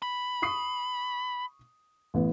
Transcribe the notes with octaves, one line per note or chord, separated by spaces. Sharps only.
B5
C#6 D#6 C7
A1 B3